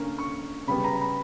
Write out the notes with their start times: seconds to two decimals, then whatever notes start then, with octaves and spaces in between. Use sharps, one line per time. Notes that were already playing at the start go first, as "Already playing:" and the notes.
Already playing: D3 A#3 C#4
0.18 C#6
0.67 C#3 G3 B3 B5
0.84 A#5
0.95 A#5
1.01 B5